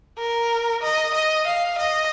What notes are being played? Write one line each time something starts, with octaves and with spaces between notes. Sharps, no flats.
A#4
D#5
D#5
F5
D#5